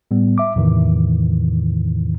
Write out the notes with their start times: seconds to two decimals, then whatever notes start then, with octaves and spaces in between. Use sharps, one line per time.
0.11 A2 G3 B3
0.38 E5 D6
0.56 E2 A2 C3 D#3 E3